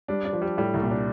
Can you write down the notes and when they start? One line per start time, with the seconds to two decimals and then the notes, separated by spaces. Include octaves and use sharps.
0.08 G3 D4
0.25 D4
0.33 F3
0.42 G3
0.58 A2 G3
0.74 C2
0.82 A#2
0.91 D4